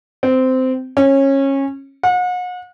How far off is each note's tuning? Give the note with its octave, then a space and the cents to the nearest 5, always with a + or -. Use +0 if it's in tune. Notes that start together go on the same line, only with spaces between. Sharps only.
C4 -15
C#4 -20
F#5 -40